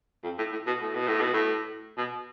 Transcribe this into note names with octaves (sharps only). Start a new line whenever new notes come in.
F2
A2
A2
B2
A2
B2
A2
B2
A2
B2